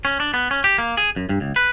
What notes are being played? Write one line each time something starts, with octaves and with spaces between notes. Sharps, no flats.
C#4
D4
B3
C#4
G4
A#3
G#4
F#2
G2
C#2
B4